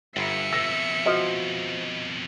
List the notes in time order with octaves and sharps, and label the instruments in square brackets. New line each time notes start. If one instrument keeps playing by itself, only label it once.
[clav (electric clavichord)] G1 [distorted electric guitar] G2 [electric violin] E5 C#7
[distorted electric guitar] F2 B2 [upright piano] E6 A#6
[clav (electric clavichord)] F3 [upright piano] F#4 D#5